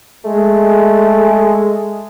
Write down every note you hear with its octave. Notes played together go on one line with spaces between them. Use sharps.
G#3 A3